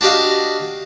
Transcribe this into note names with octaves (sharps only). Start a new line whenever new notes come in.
D4 F#4 G4 D#5 F5